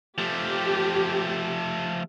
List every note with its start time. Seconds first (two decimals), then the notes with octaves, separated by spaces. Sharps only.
0.18 F3 A3 G4